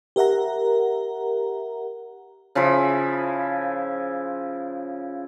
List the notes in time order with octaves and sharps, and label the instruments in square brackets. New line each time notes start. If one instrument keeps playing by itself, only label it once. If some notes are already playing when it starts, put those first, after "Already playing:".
[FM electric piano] G4 A#4 E5 F#5 A#5
[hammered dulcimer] C#3 F3 E4 B5